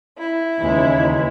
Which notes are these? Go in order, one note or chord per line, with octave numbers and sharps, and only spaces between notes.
E4
D#2 C#3 E3 G#3